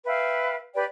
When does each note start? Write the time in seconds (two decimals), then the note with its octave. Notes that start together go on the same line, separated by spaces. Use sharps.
0.05 B4 E5 F5 G5
0.74 G4 B4 D5 G5